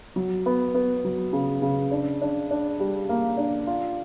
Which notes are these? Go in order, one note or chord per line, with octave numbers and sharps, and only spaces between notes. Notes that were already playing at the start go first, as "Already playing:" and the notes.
F#3
B3
B3
F#3
C#3
C#3
D4
D4
D4
G3
A#3
D4
F4